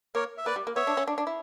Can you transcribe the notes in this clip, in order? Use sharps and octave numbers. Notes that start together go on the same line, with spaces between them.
A#3 A#4 C#5
E5
A#3 B4 D5
G3
A#3
B3 C#5 E5
D4
C#4
D4
D4
E4